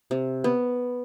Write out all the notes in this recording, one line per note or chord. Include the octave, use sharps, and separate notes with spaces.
C3
B3